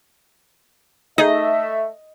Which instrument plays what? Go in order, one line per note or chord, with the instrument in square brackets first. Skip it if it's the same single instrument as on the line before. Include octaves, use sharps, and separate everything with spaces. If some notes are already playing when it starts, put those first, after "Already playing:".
[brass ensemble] A3 E5 [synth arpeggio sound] D#4 G#4 [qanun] D#5